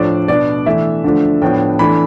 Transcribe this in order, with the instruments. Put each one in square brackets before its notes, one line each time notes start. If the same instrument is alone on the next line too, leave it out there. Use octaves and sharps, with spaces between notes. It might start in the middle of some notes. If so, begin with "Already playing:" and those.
Already playing: [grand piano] A2 F3 A3 D4 D5
B2 B3 D4 D5
E3 A3 D4 E5
D3 F3 A3 D4
A2 F3 B3 D4 G5
E3 A3 D4 B5